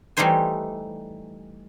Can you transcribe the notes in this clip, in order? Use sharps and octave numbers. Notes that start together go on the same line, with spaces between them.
E3 G3 A3 D#4 C5 G#5